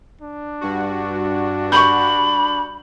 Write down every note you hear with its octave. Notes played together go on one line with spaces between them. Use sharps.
D4
G2 F#4
B5 C#6 G6